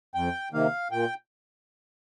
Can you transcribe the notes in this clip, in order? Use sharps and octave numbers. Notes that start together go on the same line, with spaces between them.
F2 G5
C3 D#3 A#3 F5
A#2 G5